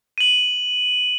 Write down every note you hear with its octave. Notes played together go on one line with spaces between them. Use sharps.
D#7 F#7